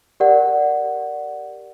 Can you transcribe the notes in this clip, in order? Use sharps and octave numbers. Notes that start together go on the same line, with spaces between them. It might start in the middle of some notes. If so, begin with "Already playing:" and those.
G4 A#4 D5 F#5